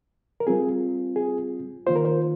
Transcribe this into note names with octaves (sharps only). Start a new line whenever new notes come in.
A#4
G3 C4 F4 G#4
G#4
D#3 A#3 F4 C5
A#4
C5